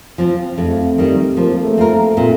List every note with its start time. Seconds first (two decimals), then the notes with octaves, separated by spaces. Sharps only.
0.18 F3 C4
0.58 F2 A3 C4
0.98 D#3 G3
1.37 F3 A#3
1.56 A#3
1.64 A3
1.77 C4 F4 A#4
2.17 A#2 A3 C4